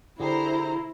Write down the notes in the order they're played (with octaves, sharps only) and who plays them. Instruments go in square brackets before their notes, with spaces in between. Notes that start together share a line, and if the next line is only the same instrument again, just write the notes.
[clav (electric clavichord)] D3 G4 G#4 [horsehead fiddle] E4 [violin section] C5 A#5